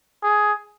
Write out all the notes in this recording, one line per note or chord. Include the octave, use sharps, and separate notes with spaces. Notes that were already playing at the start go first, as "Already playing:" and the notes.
G#4